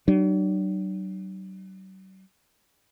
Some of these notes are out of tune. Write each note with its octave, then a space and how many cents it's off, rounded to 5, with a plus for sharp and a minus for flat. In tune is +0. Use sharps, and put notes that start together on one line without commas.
F#3 +45 D4 +45